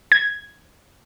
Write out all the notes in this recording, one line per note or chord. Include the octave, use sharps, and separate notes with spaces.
G#6